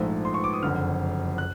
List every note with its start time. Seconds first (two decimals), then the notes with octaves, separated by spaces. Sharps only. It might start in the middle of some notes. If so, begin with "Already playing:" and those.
Already playing: A#1 G#2 F3 A3
0.25 C6
0.34 C#6
0.44 D6
0.54 D#6
0.63 F#1 F2 D3 F6
1.38 F#6